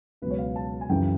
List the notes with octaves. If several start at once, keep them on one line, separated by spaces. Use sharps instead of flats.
C#2 B2 F#3 B4
C#5
F5
A5
G#5
F#2 C#3 E3 G5